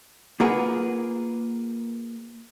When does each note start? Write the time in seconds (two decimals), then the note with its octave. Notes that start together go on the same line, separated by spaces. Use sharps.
0.40 A#3 F4 G#4 A#4 B4 F#5